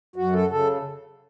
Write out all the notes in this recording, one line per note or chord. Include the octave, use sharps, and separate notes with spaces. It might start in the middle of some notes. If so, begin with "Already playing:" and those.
F#2 F#4
A4
C#3 A4